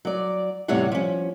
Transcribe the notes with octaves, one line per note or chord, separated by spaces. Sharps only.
F#3 D5
E2 A2 C3 G3 C#5 F#5
F3 C#4